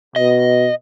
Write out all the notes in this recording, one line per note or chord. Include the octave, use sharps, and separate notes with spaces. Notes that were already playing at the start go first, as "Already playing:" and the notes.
B2 D#5